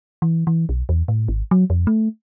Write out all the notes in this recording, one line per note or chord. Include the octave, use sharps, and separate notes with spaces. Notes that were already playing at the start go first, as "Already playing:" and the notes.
E3
E3
B1
E2
A2
G#1
F#3
F2
A3